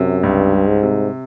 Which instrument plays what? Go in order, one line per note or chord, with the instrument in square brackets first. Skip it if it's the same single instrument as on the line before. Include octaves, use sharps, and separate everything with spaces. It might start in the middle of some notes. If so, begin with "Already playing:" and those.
Already playing: [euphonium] F#2 [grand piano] C3
[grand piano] C#2 [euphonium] G2
[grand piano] G3
[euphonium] G#2
[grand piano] C3